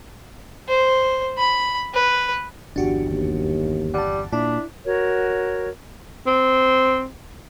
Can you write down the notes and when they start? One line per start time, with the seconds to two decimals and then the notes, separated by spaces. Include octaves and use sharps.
0.69 C5
1.38 B5
1.94 B4
2.76 G1 E2 D4 F#4 G4
3.09 D#2
3.94 G3 F#5 A5
4.33 A#2 D4 E4
4.86 F#4 A#4 C#5
6.27 C4